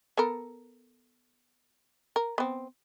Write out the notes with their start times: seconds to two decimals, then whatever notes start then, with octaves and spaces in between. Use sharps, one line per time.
0.17 B3 A4 A#4
2.16 A#4
2.38 B3 C4